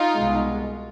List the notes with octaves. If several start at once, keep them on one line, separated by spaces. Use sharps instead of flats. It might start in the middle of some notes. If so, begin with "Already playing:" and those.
Already playing: D#4 F4
C2 B2 G#3